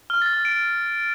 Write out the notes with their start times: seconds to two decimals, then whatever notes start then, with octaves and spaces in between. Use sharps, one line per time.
0.10 F6
0.22 A6
0.33 F6
0.45 D7